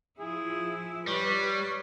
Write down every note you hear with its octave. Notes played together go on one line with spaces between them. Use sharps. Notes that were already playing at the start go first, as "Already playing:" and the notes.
F3 E4 G#4
G3 B4 C#5